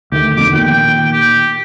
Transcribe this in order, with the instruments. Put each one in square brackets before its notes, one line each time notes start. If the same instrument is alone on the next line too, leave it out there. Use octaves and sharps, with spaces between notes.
[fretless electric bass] D2 D#3 A3 [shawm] G4
[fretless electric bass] F2 B2 D3 [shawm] D6
[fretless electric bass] A#2 D#3 [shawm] G5
[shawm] G4